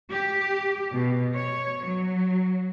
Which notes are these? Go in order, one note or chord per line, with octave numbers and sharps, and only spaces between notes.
G4
B2
C#5
F#3